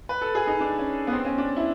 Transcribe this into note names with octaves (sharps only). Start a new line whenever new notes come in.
B4
A4
G#4
D#4
D4
C#4
B3
C4
C#4
D4
E4